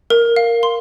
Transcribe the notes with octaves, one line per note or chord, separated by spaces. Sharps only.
A#4
F5
C6